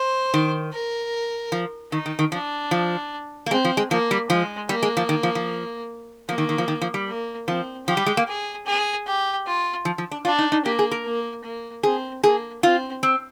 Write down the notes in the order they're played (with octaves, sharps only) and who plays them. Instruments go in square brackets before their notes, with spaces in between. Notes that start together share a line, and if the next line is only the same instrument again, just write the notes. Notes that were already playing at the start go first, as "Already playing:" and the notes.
Already playing: [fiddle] C5
[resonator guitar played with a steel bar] D#3
[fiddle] A#4
[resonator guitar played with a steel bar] F3
[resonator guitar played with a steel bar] D#3 [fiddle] D#4
[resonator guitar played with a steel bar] D#3
D#3
[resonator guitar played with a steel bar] F3 [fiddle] D4
[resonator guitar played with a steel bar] F3
A#3
[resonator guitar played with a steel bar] G#3 [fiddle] C4
[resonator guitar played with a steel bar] F3
G#3
[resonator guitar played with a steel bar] F3 [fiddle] A#3
[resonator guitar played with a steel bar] G3
[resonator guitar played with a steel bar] F3 [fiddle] G#3
[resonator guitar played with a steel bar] G3 [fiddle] A#3
[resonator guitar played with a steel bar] G#3
F3
D#3
F3
F3
[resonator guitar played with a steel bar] F3 [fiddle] A#3
[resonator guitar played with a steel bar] D#3
D#3
F3
D#3
F3
G3
[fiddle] A#3
[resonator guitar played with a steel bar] F3 [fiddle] C4
[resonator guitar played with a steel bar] F3 [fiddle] G4
[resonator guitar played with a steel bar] G3
G#3
A#3
[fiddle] G#4
G#4
G4
F4
[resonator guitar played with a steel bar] F3
F3
D4
[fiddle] D4 [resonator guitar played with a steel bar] F4
[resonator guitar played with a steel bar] D#4
D#4
[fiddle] A#3 [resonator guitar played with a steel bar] G4
[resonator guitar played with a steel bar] G#4
A#4
[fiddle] A#3
A#3
[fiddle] C4 [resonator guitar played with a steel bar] G#4
[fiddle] A#3 [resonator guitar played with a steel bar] G#4
[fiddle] C4 [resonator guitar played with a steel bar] F4
[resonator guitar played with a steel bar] C4